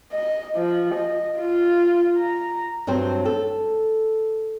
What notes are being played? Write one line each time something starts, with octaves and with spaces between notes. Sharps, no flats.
D#5
F3
D#5
F4
A#5
G2 F#3 C4 D4 C5
A4